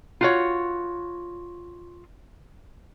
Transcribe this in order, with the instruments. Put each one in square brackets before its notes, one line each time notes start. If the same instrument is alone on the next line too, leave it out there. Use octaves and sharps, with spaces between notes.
[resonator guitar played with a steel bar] F4 F#4 C#5